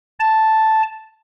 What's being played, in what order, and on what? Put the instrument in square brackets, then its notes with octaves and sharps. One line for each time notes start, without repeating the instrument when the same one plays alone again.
[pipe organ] A5